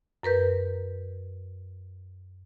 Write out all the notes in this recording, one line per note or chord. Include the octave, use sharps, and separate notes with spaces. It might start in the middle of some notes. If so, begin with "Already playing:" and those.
F#2 A#4 B4 G6